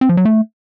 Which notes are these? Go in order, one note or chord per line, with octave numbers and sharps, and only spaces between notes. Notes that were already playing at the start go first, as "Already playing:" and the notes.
C4
F3
F#3
A3